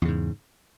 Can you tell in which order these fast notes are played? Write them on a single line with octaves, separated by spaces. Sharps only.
E2 C#3 G#2